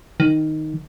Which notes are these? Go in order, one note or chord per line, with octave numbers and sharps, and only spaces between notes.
D#3